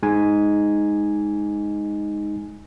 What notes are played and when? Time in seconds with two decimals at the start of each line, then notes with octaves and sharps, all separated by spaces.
0.03 G#3 D#4 G#5